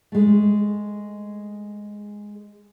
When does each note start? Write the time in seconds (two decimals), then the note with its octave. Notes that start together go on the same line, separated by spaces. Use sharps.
0.12 G#3 A3